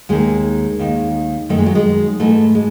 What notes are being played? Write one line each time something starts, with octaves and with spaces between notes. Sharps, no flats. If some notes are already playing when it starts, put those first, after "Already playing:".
D#2 D#3 G#3
D#2 D#3
F#2 D#3 A3
G#3
F#3
G#3
G#2 E3 A3
G#3